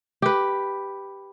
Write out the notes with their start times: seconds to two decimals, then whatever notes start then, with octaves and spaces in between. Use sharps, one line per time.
0.22 G4 B4